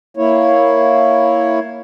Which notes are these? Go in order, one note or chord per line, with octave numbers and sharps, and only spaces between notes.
A#3 E4 C#5